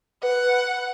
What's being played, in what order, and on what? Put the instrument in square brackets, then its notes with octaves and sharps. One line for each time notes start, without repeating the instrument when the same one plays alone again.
[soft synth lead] B4 [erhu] F#5